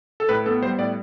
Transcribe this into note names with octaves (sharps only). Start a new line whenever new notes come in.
A4
A2 B4
B3 A4
G3 C5
A2 D5